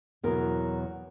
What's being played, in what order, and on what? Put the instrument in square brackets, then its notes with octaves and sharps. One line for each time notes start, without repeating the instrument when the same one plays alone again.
[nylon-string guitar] E2 B2 F#3 A#4